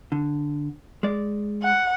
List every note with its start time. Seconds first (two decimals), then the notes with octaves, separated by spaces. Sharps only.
0.12 D3
1.03 G#3 D5
1.62 F#5